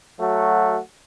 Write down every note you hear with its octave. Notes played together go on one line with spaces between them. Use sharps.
F#3 A3 F#4